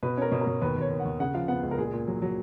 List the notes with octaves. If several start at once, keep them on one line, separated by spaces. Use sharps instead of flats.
B2 B4
C#4 A#4
B2
A#4
B2
D#2 B4
D#2
C#5
D#2
F#5
D#2
C#3 F#5
F3 F5
B3 F#5
C#2
A#4
A#2 G#4
A#2
F#3
F#3